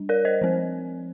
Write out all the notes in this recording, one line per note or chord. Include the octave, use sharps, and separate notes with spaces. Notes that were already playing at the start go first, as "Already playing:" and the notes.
Already playing: G3 D4
A#4 D5
C5 D#5
F3 C4